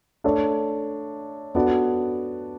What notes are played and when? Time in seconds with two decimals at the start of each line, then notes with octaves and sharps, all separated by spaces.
0.24 A3 D4 A4 C#5
1.55 B3 D4 F#4 A4 D5